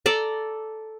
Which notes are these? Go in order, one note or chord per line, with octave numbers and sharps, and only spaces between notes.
A4 D5 A#5